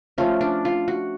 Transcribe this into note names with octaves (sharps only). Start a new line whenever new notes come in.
F3 A3 C#4 F4
D4
F4
F#4